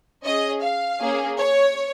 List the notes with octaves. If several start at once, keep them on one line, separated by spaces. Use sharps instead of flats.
C#4 G#4 D#5
F5
A#3 C#4 G#4
C#5